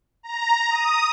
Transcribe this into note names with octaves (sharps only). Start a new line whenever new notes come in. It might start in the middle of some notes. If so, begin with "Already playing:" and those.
A#5
D#6